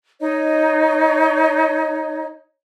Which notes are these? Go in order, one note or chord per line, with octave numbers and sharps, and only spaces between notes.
D#4 C#5 D#5